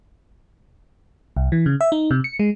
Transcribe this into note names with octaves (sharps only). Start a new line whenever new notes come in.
C2
E3
C#3
E5
D#4
C3
C#7
G#3